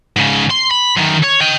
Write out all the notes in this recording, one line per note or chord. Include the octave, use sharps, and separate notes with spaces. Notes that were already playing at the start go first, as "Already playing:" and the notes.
G#2 C#3
C6
B5
F#2 D#3
C#5
D#5 G5